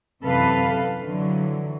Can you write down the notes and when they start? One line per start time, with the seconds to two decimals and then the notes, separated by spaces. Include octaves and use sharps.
0.22 F#2 C3 E3 A4 B4 F5
1.02 D3 E3 F#3